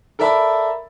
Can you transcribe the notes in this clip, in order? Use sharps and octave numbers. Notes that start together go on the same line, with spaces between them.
A4 A#4 D5 E5 A5 B5